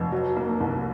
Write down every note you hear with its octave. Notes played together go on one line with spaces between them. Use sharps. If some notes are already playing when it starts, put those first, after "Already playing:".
Already playing: F1
F#3
A#3
C2